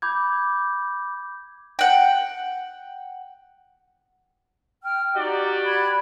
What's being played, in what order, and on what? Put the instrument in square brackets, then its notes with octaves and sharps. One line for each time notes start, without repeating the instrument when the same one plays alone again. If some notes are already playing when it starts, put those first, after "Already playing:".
[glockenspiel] B5 D6 G6 G#6
[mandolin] F#5 G5
[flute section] G5 F6
[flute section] D#4 [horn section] F#4 G4 D5
[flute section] B5 F#6 G#6